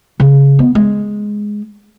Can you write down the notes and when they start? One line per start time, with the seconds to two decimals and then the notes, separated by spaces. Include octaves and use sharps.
0.20 C#3
0.59 B3
0.75 G#3